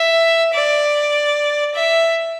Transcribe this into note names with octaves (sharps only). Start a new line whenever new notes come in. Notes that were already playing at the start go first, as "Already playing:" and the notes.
Already playing: E5
D5
E5